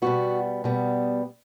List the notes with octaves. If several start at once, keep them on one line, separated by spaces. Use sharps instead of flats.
B2 G3 B3 F#4
B2 G3 B3